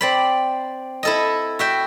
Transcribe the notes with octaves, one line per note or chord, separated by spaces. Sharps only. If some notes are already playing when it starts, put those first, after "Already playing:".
C4 D5 B5
E4 A4 D#5
F#4 E5 G5